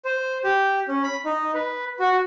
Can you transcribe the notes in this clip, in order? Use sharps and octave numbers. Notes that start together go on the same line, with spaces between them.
C5
G4
C#4
B5
D#4
B4
F#4